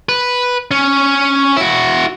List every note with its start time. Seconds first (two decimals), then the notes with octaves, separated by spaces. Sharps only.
0.09 B4
0.71 C#4
1.57 E4 F#4